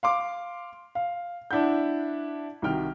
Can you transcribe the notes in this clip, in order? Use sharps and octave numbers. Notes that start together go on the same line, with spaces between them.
F5 C6 D6
F5
D4 E4 F#5 G6
C2 D#3 F#4 G5 F6